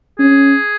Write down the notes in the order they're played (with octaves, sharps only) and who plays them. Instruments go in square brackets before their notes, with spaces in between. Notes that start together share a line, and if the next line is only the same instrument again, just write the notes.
[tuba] C#4 [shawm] G#4